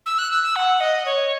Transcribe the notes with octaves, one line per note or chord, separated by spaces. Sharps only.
E6
F#6
E6
E6
F#5
D#5
C#5